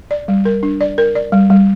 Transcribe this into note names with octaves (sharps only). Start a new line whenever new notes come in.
D5
G3
A#4
D4
D5
A#4
D5
G3
G3